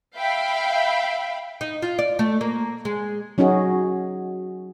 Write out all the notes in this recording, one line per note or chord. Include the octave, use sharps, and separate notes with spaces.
E5 F5 G5 B5
D#4
F4
D5
A3
A#3
G#3
F#3 C#4 D#4 F#4 G#4